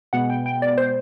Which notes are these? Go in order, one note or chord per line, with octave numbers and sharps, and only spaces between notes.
B2 G#3 B3 F#5
G5
G5
D5
C5